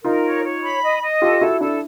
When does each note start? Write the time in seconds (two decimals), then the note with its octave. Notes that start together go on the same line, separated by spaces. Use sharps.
0.04 D#4 F4 A#4
0.25 C#5
0.44 C#5
0.63 B5
0.83 D#5
1.02 D#5
1.22 F4 G4 A4
1.41 E4 F#4 A4
1.61 D4 E4 A4